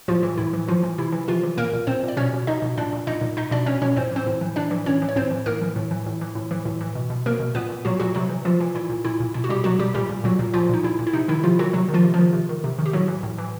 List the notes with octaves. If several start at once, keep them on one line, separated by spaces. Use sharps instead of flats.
A2 F3 F4
E3
A2 E4
E3
A2 F3 F4
E3
C3 E4
E3
C3 F3 F4
E3
A#2 A#3 A#4
A#2
A#2 C4 C5
A#2
D5
B2 C#4 C#5
B2
B2 D#4 D#5
B2
A#2 D4 D5
A#2
A#2 D#4 D#5
A#2
B2 D#4 D#5
B2 D4 D5
B2 C#4 C#5
B2 C#4 C#5
A2 C4 C5
E3 C4 C5
A2
E3
A2 D4 D5
E3
A2 C#4 C#5
E3
C#5
A2 C4 C5
E3
A2 A#3 A#4
E3
A2
E3
A2
E3
A2
E3
A2
E3
B2
B2
B2 A#3 A#4
B2
A#2 B3 B4
A#2
A#2 F#3 F#4
A#2 F#3 F#4
C3 F#3 F#4
E3
C3 F3 F4
E3
A#2 E4
A#2
A#2 E4
A#2
B2 E4
F#4
B2 G3 G4
B2 F#3 F#4
B2 G3 G4
A#2 G3 G4
A#2
A#2 F#3 F#4
A#2
A#2 F3 F4
A#2 D#4
A#2 E4
A#2
E4
C3 D#4
D#3 E4
C3 F3 F4
D#3 F#3 F#4
C3 F#3 F#4
D#3
F3 F4
C3
F3 F4
D#3
C3
D#3
C3
D#3
G4
A2 F#3 F#4
E3
A2
E3